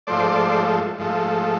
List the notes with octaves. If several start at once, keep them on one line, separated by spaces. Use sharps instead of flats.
G#2 F3 A3 C5 D5
G#2 F3 A3